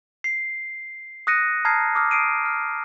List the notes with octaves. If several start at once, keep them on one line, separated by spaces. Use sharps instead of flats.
C7
D#6 F#6 A#6 C#7 D#7
A5 A#5 D#6 F6 G#6 C7
D6 D#6 F6
D#6 C7 D7 D#7
F6